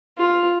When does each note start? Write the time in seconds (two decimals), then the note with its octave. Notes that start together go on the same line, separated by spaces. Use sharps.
0.18 F4